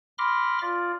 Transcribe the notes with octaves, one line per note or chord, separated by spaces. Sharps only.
B5 C6 D6 F6 A#6
F4 D5